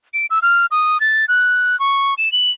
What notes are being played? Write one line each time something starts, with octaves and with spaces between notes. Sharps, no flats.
D7
E6
F6
D#6
A6
F#6
C#6
E7
F#7